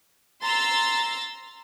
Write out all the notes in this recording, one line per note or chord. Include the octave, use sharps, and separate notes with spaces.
A#5 C6 E6 A6 A#6